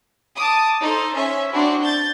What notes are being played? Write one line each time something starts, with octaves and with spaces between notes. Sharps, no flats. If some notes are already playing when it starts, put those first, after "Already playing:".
A5 D6 D#6
D#4 A4 C5
C#4 C5 E5
C4 D4 E4 F#4
G6 A6